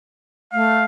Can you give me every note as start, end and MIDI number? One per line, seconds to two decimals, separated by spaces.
0.53 0.83 57
0.53 0.85 77